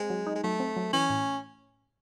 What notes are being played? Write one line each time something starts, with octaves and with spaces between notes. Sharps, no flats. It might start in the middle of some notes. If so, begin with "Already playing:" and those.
Already playing: G#3 C4
F#3
D#4
G#3
F#3 A3
C4
F#3
E3 C#4
A2